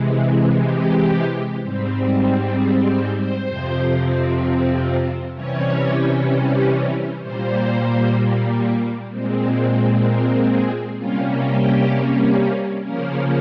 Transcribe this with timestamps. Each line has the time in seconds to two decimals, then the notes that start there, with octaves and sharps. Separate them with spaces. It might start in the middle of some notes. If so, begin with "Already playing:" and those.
Already playing: C3 E3 G#3
0.66 G4
1.59 G#2 G3 C4
2.53 G#4
2.85 C5
3.15 C5
3.47 F2 C3 F3 C4
5.34 C3 E3 G3 C#4 C#5
7.22 A#2 G3 A#3 C5
9.10 A#2 G#3 C4
10.03 A#4
10.50 G#4
10.98 C3 G3 A#3 C#4 F4
11.45 G4
12.84 C#3 F3 A#3 C#4 A#4